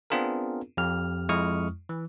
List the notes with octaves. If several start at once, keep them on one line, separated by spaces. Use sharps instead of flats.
B3 C4 D4 F4 G#4 A#4
F2 G4 F6
F2 G#3 E4 C#6 D#6 F6
E3